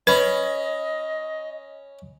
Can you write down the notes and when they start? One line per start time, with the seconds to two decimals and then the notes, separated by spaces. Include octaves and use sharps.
0.07 C#4 B4 D#5 B5